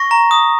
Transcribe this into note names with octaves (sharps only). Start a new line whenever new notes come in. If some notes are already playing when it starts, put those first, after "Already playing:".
Already playing: C#6 A#6
A#5
D#6